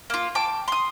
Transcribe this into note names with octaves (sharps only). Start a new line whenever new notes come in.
A#3 F4
G5 A5 D6
C6 D#6